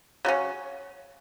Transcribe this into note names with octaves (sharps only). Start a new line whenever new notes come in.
C#3 F#3 C#4